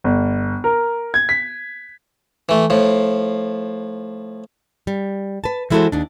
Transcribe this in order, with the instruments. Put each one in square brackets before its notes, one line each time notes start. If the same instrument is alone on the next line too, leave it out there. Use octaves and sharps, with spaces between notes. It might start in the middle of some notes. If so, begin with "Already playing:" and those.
[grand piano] G1
A#4
G#6
B6
[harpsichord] E3 A3
A2 F3
[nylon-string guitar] G3
B4 A5
E3 G#3 E4 F#4 A4 C5
D#2 D4